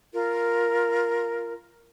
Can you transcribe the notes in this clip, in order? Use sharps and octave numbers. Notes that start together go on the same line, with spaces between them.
F4 A#4